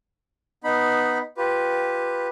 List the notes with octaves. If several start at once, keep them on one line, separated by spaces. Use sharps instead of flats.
B3 D#4 B5
F4 G4 B4